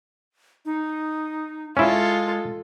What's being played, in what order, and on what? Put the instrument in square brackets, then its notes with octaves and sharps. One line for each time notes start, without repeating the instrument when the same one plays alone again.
[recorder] D#4
[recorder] G#3 [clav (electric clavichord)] C#4 E4 [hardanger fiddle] F4 A4